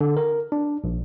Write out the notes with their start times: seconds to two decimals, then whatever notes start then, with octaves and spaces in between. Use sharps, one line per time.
0.01 D3
0.17 A#4
0.52 D4
0.84 A#1